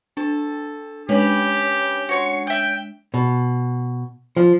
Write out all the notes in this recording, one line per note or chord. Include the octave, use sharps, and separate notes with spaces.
D4 A4
G#3 C#4 D4 G4 B4
F#4 C#5 C6
E5 G5 F#6
B2
F3